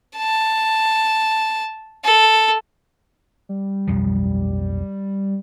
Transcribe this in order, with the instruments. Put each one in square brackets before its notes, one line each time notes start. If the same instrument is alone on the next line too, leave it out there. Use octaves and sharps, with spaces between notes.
[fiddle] A5
A4
[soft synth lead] G3
[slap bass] B1 F2 F3